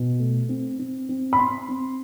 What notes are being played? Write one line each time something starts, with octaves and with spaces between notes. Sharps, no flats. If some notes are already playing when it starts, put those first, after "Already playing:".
Already playing: B2
A3
C4
C4
C4
B5
C4 C6
C4